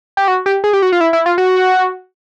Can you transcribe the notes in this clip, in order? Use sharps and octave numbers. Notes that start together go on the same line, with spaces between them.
G4
F#4
G4
G#4
G4
F#4
F4
E4
E4
F4
F#4